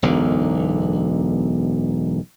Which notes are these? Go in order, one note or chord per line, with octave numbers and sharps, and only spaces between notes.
E1 B1 F#2 D3